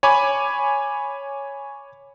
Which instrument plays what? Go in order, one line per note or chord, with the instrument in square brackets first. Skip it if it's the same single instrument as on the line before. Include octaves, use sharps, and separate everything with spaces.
[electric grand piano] C#5 G#5 B5 D6